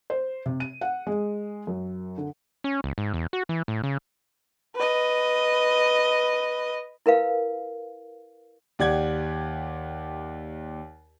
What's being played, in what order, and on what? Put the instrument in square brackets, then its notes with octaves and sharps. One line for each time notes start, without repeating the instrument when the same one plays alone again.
[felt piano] C5
C3
D#7
F#5
G#3
F#2
D3
[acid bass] C#4
C#2
G#2
E2
F#4
E3
A2
C#3
[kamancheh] B4 D#5
[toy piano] E4 A#4 B4 F5
[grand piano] D#2 G4 D5 F#5 G#6